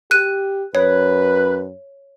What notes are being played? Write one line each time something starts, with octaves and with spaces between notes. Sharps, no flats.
G4 F#6 D#7
F#2 B4 C#5